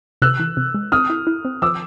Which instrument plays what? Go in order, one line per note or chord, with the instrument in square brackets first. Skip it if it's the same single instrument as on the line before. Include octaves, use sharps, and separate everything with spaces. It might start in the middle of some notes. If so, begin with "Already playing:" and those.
[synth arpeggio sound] C3 [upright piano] E6 F#6
[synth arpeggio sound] E3
C3
G#3
[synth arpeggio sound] C4 [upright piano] D#6 F6
[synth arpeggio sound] E4
E4
C4
[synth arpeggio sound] F3 [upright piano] D6 E6